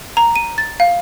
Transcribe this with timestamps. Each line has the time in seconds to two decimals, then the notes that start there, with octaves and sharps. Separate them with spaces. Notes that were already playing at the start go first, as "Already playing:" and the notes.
0.17 A#5
0.36 D#7
0.58 A6
0.80 F5